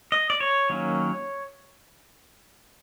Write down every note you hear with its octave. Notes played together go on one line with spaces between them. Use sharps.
D#5
D5
C#5
D#3 F#3 A#3 C#4